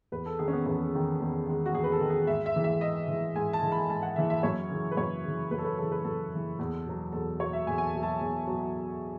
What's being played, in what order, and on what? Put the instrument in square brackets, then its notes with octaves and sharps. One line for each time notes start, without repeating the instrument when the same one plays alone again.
[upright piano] E2 B4
A4
D#3 G#3 G#4
C#4
B3
E2 C#4
D#3 G#3
E2
D#3 G#3
F#4
E2 G#4
B4
A4
D#3 G#3
G#4
G#2 E5
E5
E3 G#3
E5
G#2 D#5
E3 G#3
G#2 G#5
A5
E3 G#3
B5
G#2 A5
F#5
E3 G#3 E5
E5
F#2 C#5
C#3 E3
B4
F#2 C#5
C#3 E3
F#2 B4
A4
B4
C#3 E3 A4
B4
F#2 A4
C#3 E3
E2
B2 F#3
E2 A4
B2 F#3 C#5
E5
E2 G#5
G#5
A5
B2 F#3
A5
E2
B2 F#3